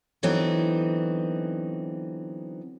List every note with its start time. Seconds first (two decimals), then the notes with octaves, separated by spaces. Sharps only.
0.23 D3 E3 F#3 B3 C4 D#4